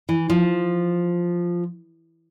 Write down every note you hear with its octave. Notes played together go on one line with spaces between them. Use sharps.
E3
F3